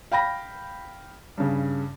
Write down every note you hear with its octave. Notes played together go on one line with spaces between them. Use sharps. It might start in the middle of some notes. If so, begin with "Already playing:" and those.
F5 G5 B5 A#6
G2 C#3